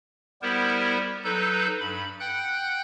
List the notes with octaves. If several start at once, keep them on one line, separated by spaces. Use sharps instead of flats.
G3 B3 E4 G4 A#4 C5
F#3 D#4 A4 B4 G6
G2 B5
F#5 G5 F#6 G6